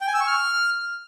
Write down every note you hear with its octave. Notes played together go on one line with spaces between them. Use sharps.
G5
G#5
E6
C#6
F6